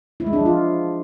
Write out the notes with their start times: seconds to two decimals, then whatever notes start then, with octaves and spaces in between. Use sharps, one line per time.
0.20 E4
0.26 G#3
0.33 D4
0.39 F3
0.46 F4